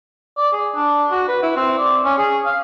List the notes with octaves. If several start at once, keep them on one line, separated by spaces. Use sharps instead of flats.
D5
G#4
D4
F#4
B4
E4
C4
D5
C#4
G#4
F5